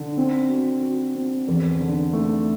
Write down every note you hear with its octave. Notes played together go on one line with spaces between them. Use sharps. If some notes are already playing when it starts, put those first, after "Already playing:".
Already playing: D3
C4
F#4
F#4
C4
E2
D3
A3